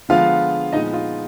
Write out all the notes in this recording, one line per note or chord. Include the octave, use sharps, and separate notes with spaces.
D3 F3 G#3 B3 F4 F5
A#2 F3 G#3 B3 D#4 D#5
F4